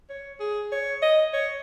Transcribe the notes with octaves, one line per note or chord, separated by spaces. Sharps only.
C#5
G#4
C#5
D#5
C#5